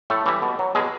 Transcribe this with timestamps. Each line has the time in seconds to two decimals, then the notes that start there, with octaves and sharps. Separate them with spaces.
0.10 A2 A3 A4
0.26 E3 G3
0.42 B2
0.59 F#3
0.75 B2 G#3 G#4